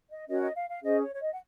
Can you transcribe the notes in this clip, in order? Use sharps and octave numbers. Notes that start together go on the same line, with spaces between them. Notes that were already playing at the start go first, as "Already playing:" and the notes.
D#5
C#4 F#4 A#4 C#5 D#5
D#5
F5
F5
C#4 G#4 C5 D#5
C#5
C#5
D#5
F#5